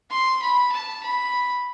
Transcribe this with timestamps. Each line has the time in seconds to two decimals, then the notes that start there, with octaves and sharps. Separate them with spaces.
0.11 C6
0.42 B5
0.72 A5
1.03 B5